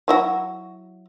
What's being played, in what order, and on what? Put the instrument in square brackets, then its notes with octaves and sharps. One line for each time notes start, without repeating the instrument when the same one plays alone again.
[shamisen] F#3 E4 F#4